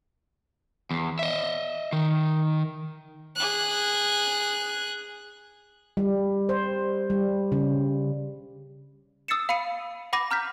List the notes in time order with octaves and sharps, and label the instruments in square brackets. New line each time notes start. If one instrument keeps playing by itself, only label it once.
[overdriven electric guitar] E2
D#5 E5
D#3
[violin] G#4 F#6
[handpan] G3
C5
G3
C#3
[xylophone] D#6 E6 A6 C7 C#7 E7
F5 B5 C7 C#7 D#7
F#5 B5 D6 A#6 D#7
A#5 F6 G6 B6